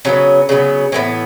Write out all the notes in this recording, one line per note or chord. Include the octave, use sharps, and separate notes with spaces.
C#3 F#3 B3 C#4
C#3 F#3 B3
A2 E3 B3 C#4